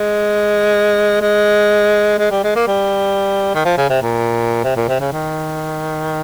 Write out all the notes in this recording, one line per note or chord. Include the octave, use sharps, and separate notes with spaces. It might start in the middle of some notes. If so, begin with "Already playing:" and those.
Already playing: G#3
G#3
G#3
G3
G#3
A#3
G3
D#3
F3
C#3
C3
A#2
C3
A#2
C3
C#3
D#3